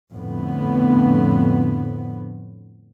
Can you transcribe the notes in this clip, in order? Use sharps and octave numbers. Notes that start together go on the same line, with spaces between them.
F2 A2 D3 B3